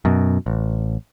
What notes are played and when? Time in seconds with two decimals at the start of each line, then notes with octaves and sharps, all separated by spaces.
0.05 F#2 B2
0.46 A1